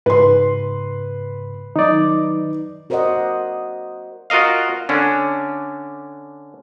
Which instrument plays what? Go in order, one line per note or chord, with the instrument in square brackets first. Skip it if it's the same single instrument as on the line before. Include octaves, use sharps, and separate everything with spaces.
[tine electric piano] G#2 C#3 [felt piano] B4 C6
[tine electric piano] D#3 F#3 [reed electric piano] D#4 D5
[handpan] F#4 A#4 C5 D5 D#5 F#5
[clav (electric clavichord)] F4 F#4 A#4 D#5 F5
D3 C#4 D4